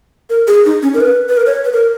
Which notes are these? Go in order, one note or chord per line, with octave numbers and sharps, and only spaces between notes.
A#4
G#4
D#4
C#4
A#4
B4
B4
A#4
C#5
B4
A#4